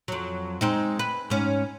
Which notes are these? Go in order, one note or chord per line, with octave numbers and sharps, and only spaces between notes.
F2 F#3
G#3 C4 D#4
B4
G#2 C#4